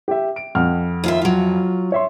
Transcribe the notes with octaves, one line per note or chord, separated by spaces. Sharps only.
G4 E5
D7
F2 F#5 F6
D#2 F4 E5
F#3 F4
C#5 E5 C6